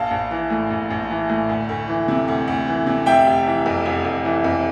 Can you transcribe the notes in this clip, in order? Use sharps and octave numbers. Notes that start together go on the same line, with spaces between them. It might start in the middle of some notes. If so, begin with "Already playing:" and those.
Already playing: A#1 F5 A5
A#1
E3
A2
A#1
A#1
E3
A2
D2
D2
E3
C3
D2
D2
E3
C3
F1 E5 G5
F1
E3
F2
F1
F1
E3
F2